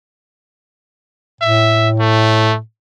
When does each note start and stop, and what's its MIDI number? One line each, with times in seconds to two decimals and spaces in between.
1.41 2.59 45
1.41 1.89 76
1.99 2.54 57